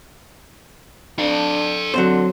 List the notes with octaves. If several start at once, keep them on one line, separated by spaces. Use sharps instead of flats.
D4 A4 F5
D3 F#3 C4 C5